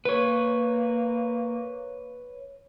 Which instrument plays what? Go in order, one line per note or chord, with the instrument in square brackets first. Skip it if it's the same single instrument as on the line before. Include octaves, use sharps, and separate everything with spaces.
[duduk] A#3 [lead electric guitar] B4 C#5